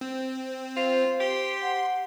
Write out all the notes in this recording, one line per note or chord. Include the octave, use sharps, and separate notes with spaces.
C4
F4 C5
G4 C6
F#5